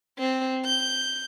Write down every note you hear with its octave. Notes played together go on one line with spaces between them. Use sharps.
C4
G6